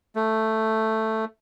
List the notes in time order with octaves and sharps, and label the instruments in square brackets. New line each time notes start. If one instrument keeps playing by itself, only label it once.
[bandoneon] A3